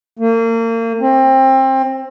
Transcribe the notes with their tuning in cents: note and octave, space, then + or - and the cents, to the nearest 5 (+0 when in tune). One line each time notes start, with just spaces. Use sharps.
A#3 -35
C4 +25